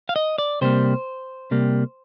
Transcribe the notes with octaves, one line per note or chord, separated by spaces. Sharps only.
F5
D#5
D5
C3 G3 A#3 C5
C3 G3 A#3